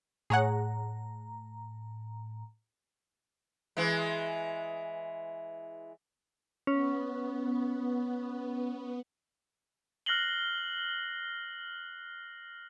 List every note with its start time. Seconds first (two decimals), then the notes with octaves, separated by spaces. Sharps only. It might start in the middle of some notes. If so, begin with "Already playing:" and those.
0.30 A2 G#4 C#5 F#5 A#5
3.77 E3 G#3
6.67 B3 C#4
10.06 F6 F#6 A#6 C7 F#7 G7